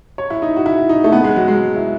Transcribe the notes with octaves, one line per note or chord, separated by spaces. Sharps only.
C#5
E4
D#4
F#4
E4
D#4
A3
B3
G#3
F#3
G#3
E4